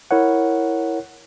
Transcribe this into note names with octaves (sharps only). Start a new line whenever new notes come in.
E4 A#4 C#5 F#5